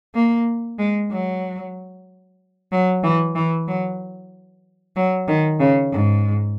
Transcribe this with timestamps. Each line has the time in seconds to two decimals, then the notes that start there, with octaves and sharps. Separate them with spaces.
0.15 A#3
0.79 G#3
1.11 F#3
2.72 F#3
3.03 E3
3.35 E3
3.68 F#3
4.96 F#3
5.28 D#3
5.60 C#3
5.92 G#2